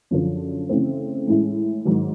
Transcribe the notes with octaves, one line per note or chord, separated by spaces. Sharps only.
F#2 D3 F3
C#3 E3 A3 C4
A2 E3 G#3 C#4 E4
G#2 D#3 F#3